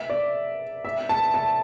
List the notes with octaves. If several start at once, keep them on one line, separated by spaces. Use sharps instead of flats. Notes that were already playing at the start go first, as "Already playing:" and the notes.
Already playing: E5
D5
E5
A5
A5